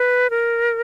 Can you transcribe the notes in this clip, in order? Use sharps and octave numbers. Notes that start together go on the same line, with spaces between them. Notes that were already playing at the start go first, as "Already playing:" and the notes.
Already playing: B4
A#4